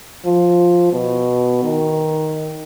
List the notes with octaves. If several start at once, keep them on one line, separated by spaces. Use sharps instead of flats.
F3
B2
D#3